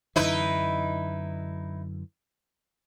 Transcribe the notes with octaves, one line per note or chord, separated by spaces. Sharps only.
F#2 D3 E3 D#4 E4 B4